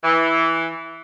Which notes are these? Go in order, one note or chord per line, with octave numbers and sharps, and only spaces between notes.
E3